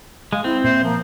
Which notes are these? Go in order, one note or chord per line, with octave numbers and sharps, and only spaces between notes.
G#3 F5
C4 E4
A#2 C5 E5
F3 A#3